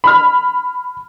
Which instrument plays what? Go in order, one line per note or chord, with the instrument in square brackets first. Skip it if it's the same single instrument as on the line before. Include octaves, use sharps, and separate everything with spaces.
[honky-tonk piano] B5 F6